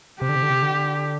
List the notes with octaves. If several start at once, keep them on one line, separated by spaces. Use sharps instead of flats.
C3 G4
D3
C3
D3
C3
D3